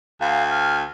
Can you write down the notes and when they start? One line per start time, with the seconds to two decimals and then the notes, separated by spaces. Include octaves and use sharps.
0.21 D2 F5
0.50 F6